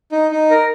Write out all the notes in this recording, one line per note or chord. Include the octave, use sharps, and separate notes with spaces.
D#4
D#4
A#4